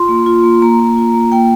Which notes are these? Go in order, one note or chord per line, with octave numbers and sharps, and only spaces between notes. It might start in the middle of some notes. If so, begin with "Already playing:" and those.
Already playing: F4 C6
A#3
F4
A#3
A#3 A#5
A#3
F4
A#3
A#3 G5